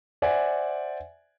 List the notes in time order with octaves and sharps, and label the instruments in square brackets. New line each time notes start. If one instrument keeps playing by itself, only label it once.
[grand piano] C5 D5 E5 F#5 G#5